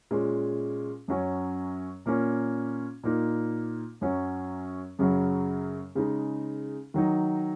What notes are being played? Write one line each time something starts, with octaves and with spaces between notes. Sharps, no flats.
A#2 G#3 C#4
F#2 F#3 C#4
A#2 A#3 C#4
A#2 A#3 D#4
F#2 F#3 C#4
F#2 C#3 F#3
C#3 G#3 D#4
D#3 F#3 D#4